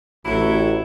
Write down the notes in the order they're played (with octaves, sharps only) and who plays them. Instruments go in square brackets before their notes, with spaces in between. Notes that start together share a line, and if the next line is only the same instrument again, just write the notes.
[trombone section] A1 [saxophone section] F#3 E4